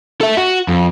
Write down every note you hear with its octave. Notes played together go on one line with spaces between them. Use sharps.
A4 E5
F#4
F2